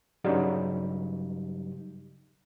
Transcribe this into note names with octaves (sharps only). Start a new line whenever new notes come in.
G2 C#3 F#3 G3 D#4 G4